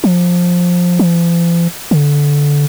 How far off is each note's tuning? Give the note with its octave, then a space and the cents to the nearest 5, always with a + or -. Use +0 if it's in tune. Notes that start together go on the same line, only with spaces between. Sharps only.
F3 +15
F3 -45
D3 -15